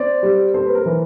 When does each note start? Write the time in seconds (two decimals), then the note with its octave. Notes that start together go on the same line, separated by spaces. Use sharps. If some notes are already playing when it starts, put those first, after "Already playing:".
Already playing: C4 D5
0.23 G3
0.54 C4 C5
0.66 B4
0.75 A#4
0.86 E3